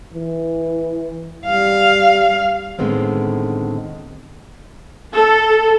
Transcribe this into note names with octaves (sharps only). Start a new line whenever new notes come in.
E3
G3 F5
A2 D3 D#3 G#3 B3 C4
A4